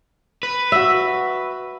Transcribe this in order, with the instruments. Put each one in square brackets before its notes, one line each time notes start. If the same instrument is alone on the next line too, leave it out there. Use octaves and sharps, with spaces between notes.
[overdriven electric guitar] B4
[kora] F#4 E5